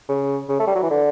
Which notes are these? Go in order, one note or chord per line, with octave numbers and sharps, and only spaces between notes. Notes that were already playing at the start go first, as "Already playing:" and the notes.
C#3
C#3
A3
G3
F#3
E3
D3